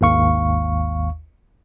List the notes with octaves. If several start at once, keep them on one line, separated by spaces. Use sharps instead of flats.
G#1 D#2 F5 C#6